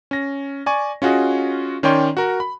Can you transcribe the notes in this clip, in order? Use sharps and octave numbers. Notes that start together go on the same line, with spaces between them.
C#4 A#6
D5 G#5 C#6
C#4 F4 F#4 G#4 D#5
D#3 C#4 C#5 D5 G5 C6
F#4 A#4
B5